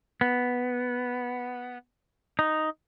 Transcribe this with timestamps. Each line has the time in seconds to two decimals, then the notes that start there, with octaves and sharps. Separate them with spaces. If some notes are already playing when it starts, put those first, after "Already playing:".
0.21 B3
2.39 D#4